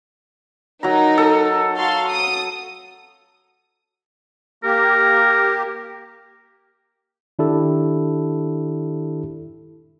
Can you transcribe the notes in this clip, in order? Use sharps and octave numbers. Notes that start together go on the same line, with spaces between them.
F#3 D#4 A#4 A#5
A4
F#4 F5 C6
D#6
A#3 G4 A#4
D#3 D4 E4 G4 A4